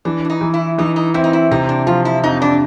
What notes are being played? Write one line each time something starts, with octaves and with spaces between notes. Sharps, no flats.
E3 D4
D4
D#4
E3
E4
E3 D#4
D#4
C4 E4
D#4
E4
C3 D#4
D4
F3 F4
E4
F2 D#4
D4